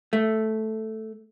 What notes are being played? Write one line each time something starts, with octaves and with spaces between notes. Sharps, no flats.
A3